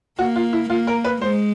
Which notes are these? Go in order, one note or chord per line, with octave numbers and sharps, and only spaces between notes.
A#3 F#4
F4
E4
A#3 F4
A#4
B4
G#3 C5